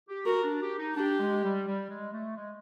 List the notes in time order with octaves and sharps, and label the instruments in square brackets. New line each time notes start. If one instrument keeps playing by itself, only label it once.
[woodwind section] G4
[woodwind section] F#4 [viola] A#4
[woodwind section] D4
G4
D#4
[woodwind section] D4 [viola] G4
[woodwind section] G#3
G3
G3
G#3
A3
G#3